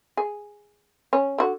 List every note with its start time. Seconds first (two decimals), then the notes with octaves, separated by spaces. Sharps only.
0.17 G#4
1.13 C#4
1.38 D3 F#4